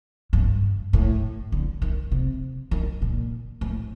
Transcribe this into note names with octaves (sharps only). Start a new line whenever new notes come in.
G2
A2
D3
D#3
C3
D#3
A#2
A2